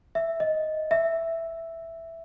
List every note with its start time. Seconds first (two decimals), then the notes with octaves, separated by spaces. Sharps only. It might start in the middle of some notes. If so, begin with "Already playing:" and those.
0.15 E5
0.40 D#5
0.91 E5